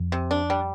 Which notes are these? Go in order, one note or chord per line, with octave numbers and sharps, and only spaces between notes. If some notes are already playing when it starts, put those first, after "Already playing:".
Already playing: F2
C3
D4
G3